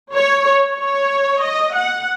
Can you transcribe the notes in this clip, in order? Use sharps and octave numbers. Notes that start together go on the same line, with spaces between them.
C#5
C#5
D#5
F#5